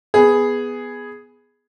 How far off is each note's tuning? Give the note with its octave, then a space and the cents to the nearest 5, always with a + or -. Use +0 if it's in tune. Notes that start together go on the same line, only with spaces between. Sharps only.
B3 +0 G#4 +0